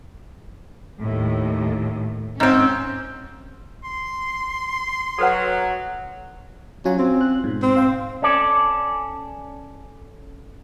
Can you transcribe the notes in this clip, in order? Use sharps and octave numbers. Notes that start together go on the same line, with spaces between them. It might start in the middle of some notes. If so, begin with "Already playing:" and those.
D#2 A2
G#2 C4 C#4
C6
F#3 A4 B4 F#5
F#3 C#4 F4 G#5
C4
F#6
G#2 B2
C4
F5 G5
C#4 A4 D5